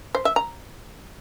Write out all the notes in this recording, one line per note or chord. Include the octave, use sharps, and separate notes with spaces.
C5
E5
A#5